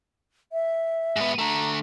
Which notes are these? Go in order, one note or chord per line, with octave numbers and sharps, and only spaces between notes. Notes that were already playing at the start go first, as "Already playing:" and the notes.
E5
G#2 B3
D3 A3 A#5